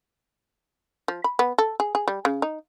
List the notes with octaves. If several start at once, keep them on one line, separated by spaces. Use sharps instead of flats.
F3
B5
B3
A4
G#4
G#4
G3
C#3
D#4